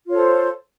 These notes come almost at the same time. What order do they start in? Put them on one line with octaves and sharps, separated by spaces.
F4 C#5 A4 C5